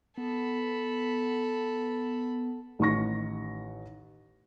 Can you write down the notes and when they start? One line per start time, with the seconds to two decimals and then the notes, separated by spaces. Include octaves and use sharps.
0.17 B3 A4 B5
2.79 A1 D#3 C#6 A#6